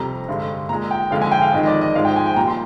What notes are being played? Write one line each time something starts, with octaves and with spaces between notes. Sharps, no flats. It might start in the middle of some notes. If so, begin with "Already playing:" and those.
Already playing: F2 C3 G3 A#5
G2 D3 G#3
A#2 G#3 A#5
G5
F2 D3 G#3 F5
G#5
G5
F5
F2 D#3 G#3 D#5
D#5
D5
D#5
G#2 F3 G#3 F5
G5
G#5
G5
A#2 G3 A#5
C6